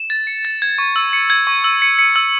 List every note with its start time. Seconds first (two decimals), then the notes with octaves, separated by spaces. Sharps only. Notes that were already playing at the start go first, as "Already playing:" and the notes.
Already playing: E7
0.10 A6
0.27 C#7
0.45 A6
0.62 G#6
0.78 C#6
0.96 E6
1.13 C#7
1.30 G#6
1.47 C#6
1.64 E6
1.82 C#7
1.99 C#7
2.16 E6